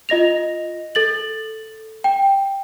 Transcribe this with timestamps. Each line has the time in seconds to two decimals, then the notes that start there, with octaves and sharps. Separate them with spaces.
0.09 F4 D#5 A#6 F7
0.95 A4 A6 F#7
2.04 G5